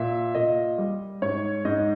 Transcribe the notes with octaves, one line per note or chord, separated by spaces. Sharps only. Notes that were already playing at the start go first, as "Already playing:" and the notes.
Already playing: A#2 E5
A#2 D#5
G3
G#2 C#5
G#2 D#5